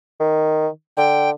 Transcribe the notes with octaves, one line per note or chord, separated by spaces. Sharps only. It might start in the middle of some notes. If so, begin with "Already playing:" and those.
D#3
D3 G5